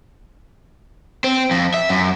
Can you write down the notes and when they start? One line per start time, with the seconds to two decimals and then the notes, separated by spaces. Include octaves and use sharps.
1.24 C4
1.51 F2
1.74 E5
1.89 F#2